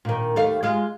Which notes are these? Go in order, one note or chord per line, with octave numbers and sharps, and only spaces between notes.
A#2 D#3
D#2 A3 F5
G#3 F4